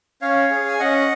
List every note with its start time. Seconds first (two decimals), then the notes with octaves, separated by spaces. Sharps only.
0.22 C#4 C#5 F5
0.50 G#4
0.68 G#5
0.79 C#4 D#5 F#5